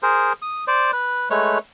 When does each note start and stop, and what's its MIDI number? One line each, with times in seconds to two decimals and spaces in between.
0.03 0.33 68
0.03 0.33 70
0.03 0.33 72
0.42 0.64 87
0.67 0.91 72
0.67 0.91 74
0.93 1.30 71
1.30 1.58 56
1.30 1.58 57
1.30 1.58 71
1.30 1.58 73